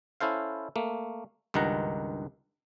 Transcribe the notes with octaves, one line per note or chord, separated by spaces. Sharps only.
C#4 E4 A4 C5 F5
A3 A#3
C#2 G2 D#3 D#4 F#5 A#5